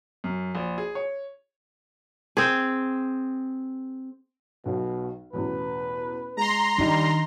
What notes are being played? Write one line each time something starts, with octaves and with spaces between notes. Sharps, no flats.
F#2
A#1
G#4
C#5
C4 G#4
B1 B2
A1 E2 B2 B4
G#3 A#5 C6
D#3 G3 D4 D#4